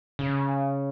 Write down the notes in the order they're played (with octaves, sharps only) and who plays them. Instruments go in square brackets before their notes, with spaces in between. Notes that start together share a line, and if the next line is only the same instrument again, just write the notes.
[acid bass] C#3